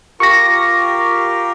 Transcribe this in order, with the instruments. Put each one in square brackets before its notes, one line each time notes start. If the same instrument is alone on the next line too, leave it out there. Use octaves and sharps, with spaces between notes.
[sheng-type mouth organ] F4 G4 A#4 [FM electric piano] C#6 A#6